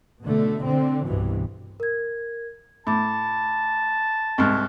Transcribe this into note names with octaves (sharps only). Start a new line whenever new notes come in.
B2 D3 A3
D3 C4
C2 G2 B2 E3
A#4 G#6
A2 A5 B5 D6
C2 G#2 C#6 F6 F#6